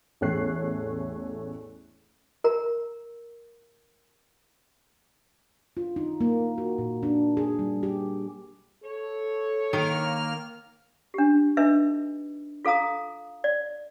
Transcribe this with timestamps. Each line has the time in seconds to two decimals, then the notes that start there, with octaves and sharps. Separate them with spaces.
0.21 A1 E2 A3 C#5 F#6 C7
2.44 A#4 A#5
5.77 F4
5.96 D#4
6.21 A#3
6.58 F#4
6.78 A#2
7.03 D4
7.37 G#4
7.59 G3
7.83 G4
8.84 A4 C#5
9.73 D#3 A#3 A#4 F6
11.14 D4 G4
11.57 D4 D#4 A4 B4 D#5 E5
12.65 F4 A4 F5 A#5 D#6
13.44 D5